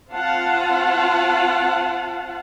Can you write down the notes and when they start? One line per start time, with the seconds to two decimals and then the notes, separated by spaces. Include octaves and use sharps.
0.11 C4 F4 F5 F#5 A5